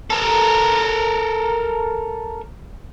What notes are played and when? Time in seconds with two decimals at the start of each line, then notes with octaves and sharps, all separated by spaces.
0.10 A4 A#4